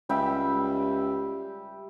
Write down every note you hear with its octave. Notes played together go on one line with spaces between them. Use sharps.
C#2 G3 G4 E5